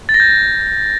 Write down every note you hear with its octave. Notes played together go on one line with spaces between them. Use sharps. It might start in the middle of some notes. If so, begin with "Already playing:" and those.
A6
A#6
G6